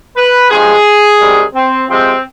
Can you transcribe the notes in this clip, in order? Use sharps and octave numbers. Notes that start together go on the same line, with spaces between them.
B4
G2 F3 G#3 G#4
C3 D#3 G3
C4
C3 F3 G#3 C4